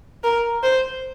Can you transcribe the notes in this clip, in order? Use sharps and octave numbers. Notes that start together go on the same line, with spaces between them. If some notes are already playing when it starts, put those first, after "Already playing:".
A#4
C5